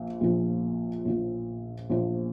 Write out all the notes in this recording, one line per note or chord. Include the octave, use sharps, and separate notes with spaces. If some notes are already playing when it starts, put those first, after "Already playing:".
Already playing: A#1 A#2
A#1 A#2 F3
A#1 A#2 F3
A#1 A#2 F3